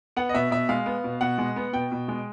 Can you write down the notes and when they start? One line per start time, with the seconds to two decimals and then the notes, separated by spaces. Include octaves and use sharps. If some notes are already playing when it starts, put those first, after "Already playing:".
0.16 B3 F#5
0.29 D#5
0.34 B2 E5
0.51 B2 E5
0.69 G#3 F5
0.86 B3
1.04 B2
1.21 B2 F#5
1.38 G#3
1.56 B3
1.73 B2 G5
1.92 B2
2.08 G#3